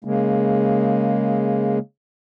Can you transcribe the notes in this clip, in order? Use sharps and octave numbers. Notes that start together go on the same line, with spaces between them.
C#3 G#3 A#3